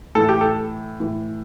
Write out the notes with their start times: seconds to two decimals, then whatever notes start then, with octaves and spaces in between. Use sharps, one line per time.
0.15 A2 E3 A4
0.29 G4
0.41 A4
1.00 A2 E3